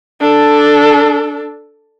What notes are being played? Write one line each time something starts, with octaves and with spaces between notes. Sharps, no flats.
D4 A4